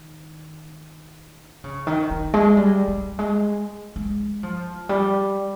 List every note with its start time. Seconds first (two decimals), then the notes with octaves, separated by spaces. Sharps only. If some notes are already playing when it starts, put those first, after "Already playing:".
Already playing: D#3
1.64 C#3
1.87 D#3
2.11 D#3
2.34 G#3
2.57 G3
2.88 G3
3.19 G#3
3.96 G#3
4.43 F3
4.89 G3